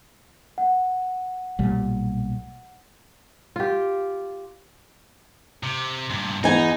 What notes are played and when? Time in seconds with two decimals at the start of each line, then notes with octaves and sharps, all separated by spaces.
0.58 F#5
1.59 B1 A#2 G3
3.56 F4 G4
5.63 C3
6.10 G2 A#2
6.44 E2 D#4 D#5 G#5